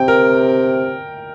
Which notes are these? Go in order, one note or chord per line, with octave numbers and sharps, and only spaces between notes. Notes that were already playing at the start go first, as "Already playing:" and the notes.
Already playing: C3 G5
A#4